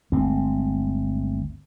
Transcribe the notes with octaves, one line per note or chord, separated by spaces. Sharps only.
G1 D2 G#3 C4